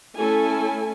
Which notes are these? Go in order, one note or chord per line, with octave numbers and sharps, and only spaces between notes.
A3 C#4 E4 A4 G#5